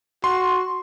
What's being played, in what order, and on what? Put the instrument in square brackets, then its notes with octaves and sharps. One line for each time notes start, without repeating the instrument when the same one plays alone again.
[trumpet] F#4 [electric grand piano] C6